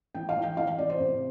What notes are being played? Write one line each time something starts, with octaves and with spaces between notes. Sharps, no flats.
E3 G5
F5
E3
G5
E3 F5
C3 D5
C5
C3